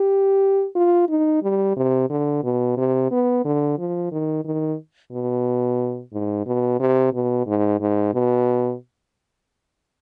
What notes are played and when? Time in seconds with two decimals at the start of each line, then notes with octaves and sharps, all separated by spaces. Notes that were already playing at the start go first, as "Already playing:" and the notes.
Already playing: G4
0.75 F4
1.09 D#4
1.43 G3
1.77 C3
2.10 D3
2.44 B2
2.77 C3
3.11 B3
3.45 D3
3.78 F3
4.12 D#3
4.45 D#3
5.12 B2
6.13 G#2
6.46 B2
6.80 C3
7.14 B2
7.47 G#2
7.81 G#2
8.14 B2